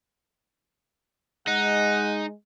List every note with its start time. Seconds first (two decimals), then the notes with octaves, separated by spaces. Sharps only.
1.47 G#3 D#4 F#5